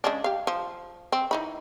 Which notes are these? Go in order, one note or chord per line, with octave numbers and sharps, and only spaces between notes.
C#3 G#3 D4
G4 F5
F3
C4
E3 D#4 B5